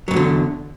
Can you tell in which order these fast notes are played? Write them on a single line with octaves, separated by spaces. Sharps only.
F#3 A#2 E2 D3